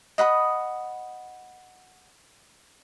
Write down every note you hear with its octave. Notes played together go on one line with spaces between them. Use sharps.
D#5 F#5 B5 D#6